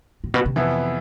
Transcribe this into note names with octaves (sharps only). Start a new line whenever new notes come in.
A2
B2
C3
F2 E3 B3 E4